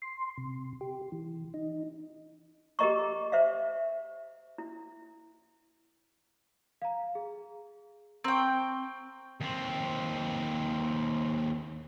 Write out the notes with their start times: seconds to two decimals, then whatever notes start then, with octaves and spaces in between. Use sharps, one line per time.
0.02 C6
0.38 C3
0.81 G4
1.12 E3
1.54 D#4
2.79 G4 G#4 A#4 D#5 A#5 C#6
3.32 C5 E5 F5
4.58 E4
6.82 F5 A#5
7.15 G#4
8.24 C4 G5 A#5 C#6
9.40 D#2 C4